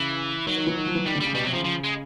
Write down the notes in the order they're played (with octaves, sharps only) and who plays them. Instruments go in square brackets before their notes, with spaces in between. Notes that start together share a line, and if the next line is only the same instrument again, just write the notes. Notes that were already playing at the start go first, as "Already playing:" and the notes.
Already playing: [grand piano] C#3 [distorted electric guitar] E3
[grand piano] D#3 [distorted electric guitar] F#3
[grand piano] D#3
E3
D#3
F3
E3
[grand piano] D#3 [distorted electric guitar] G3
[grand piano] D3
[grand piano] C#3 [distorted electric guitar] G3
[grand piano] B2 [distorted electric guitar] G3
[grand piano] C3 [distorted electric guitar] F#3
[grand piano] C#3 [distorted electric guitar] F3
[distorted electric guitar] F3
G#3